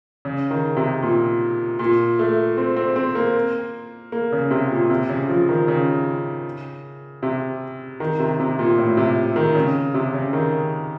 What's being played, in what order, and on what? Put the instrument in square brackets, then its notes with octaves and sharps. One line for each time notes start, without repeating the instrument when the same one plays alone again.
[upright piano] C#3
D#3
C3
A#2
A#2
A3
C4
C4
C4
A#3
A#3
C#3
C3
A#2
C3
C#3
F3
D#3
C#3
C3
D#3
C3
C3
A#2
A2
C3
D#3
C#3
C3
C#3
D#3